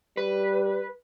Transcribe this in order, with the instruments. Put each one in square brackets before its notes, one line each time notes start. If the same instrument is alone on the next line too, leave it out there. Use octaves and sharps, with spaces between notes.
[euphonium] G3 [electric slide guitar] B4